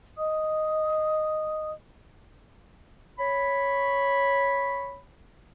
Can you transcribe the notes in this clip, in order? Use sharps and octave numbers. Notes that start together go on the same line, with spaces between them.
D#5 D#6
C#5 B5